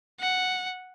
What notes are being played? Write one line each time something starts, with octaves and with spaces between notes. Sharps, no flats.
F#5